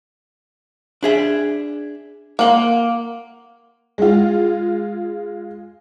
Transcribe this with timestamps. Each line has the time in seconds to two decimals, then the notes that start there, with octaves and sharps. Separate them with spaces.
1.03 D4 G#4 E5
2.39 A#3 A#4 F#5 C6
3.98 G#3 F4